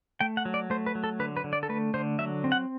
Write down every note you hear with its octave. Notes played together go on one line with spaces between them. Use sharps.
A3 G5
F#5
F#3
D5
A3 C5
B4
F#3
A4
D3 B4
B4
D3
D5
A4
A3 B4
D3 C5
F#3 E5
C4
F#5